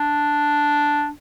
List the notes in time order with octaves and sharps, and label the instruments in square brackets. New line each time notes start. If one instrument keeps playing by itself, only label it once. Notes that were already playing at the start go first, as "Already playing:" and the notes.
Already playing: [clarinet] D4